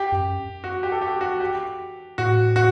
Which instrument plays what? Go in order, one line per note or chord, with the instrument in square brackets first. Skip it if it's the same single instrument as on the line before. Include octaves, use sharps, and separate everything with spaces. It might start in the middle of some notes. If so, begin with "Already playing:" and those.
Already playing: [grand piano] G4
[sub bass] F#2
[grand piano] F#4
G4
A4
G4
F#4
G4
[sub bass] A2 [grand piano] F#4
[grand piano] F#4